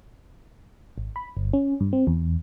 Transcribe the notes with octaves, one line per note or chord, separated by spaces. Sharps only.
G#1
B5
G1
C#4
G2
C4
E2